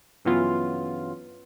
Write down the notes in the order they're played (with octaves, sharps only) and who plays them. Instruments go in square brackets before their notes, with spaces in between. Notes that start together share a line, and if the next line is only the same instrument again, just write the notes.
[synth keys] G2 C#3 E3 F#3 B3 F4